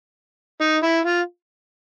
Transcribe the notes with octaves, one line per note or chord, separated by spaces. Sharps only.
D#4
E4
F4